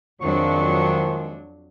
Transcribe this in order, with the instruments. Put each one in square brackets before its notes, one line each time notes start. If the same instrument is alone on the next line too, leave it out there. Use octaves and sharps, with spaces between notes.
[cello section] F2 F#3 D4 [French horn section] G#2 F3 G#3 [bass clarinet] D#3 [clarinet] C#6